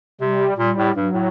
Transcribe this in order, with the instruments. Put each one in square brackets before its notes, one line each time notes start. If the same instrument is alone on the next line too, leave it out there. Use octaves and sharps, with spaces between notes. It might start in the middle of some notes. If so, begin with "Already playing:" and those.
[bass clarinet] C3 [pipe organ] G3
[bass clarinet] A#2 [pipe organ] G3
[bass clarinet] A2
[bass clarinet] G2 [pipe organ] F#3
[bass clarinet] A2